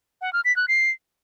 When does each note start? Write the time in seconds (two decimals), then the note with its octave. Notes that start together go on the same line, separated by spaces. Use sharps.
0.21 F#5
0.33 F6
0.45 B6
0.56 F#6
0.68 C7